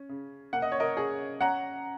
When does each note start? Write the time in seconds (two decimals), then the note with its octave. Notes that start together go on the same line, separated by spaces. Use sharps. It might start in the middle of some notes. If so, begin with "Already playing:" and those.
Already playing: C#4
0.09 C#3
0.53 A#3 F#5
0.62 D#5
0.72 C#5
0.80 A#4 D#5
0.97 C#4 G#4
1.41 C#4 F#5 A#5